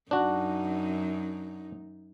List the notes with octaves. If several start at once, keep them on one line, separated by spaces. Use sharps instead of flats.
F#2 D4 D#4 F#4